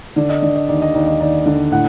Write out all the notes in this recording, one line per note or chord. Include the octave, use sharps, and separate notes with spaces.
D3 D5
D#5
D3 D5
D#5
D#2 D5
D#5
D#2 D5
D#5
D#2 D5
D3
A2 F#5